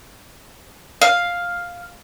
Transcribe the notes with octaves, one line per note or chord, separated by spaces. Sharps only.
F5